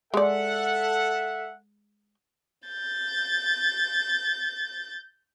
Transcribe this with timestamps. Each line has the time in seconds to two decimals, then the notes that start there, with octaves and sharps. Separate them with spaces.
0.14 G#3 A4 D5 E5 F#5
2.68 G6 A6